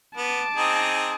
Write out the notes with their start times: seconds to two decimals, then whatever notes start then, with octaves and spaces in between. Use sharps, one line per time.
0.17 B3 A5 D6
0.57 C4 D#4 G#4